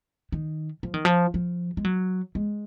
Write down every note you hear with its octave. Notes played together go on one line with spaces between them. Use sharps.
D#3
F3
D#3
F3
F3
G#3
F#3
G#3